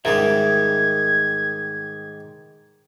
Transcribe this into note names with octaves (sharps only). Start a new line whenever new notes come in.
G#2 D#3 G3 A#4 E5 G#6